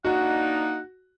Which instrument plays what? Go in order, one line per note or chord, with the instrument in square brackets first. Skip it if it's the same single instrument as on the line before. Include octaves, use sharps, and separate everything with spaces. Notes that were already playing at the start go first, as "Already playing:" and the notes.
[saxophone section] A#3 D4 D#4 [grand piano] F#4 [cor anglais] F#5